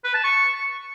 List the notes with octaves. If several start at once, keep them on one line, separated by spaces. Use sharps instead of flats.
B4
A5
C#6